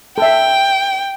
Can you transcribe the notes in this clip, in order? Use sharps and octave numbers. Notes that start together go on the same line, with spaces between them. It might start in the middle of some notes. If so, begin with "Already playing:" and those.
A4 E5 G5